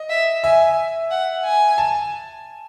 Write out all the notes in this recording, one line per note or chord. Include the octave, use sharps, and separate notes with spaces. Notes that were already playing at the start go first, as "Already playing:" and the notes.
Already playing: D#5
E5
E5 G#5
F#5
G#5
A5